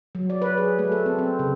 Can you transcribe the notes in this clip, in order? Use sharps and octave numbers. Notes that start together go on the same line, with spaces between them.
F#3
D5
B4
G#4
A3
A4
C4
C4
C#3